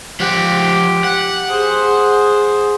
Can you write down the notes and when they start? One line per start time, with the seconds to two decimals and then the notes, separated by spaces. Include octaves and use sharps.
0.20 F3 G4 F#5
1.04 F#5
1.49 G#4 C5